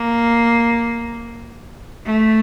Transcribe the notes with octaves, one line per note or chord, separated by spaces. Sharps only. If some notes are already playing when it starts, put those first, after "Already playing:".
Already playing: A#3
A3